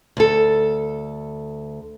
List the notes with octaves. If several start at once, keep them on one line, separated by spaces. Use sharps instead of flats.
D2 A4